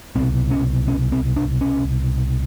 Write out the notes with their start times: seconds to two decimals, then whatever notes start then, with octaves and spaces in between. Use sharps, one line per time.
0.15 C2 B2 C4
0.51 C#4
0.88 C#4
1.12 C4
1.36 D4
1.61 C#4